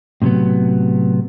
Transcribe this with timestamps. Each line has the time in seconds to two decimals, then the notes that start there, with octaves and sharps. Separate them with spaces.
0.22 A2 C3 E3 F#3 B3